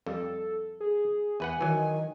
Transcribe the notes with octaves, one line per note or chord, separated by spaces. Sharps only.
F2 G3 A4
G#4
E2 B4 F#5 G#5
D#3 E3 F#3